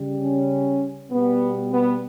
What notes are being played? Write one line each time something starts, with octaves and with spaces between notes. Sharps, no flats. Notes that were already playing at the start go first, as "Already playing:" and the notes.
Already playing: C#3 G3
C#4
B2 G3 B3
B3